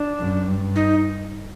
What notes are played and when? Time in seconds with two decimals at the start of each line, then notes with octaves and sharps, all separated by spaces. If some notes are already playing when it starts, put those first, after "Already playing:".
Already playing: D4
0.20 F#2
0.47 G2
0.75 D#4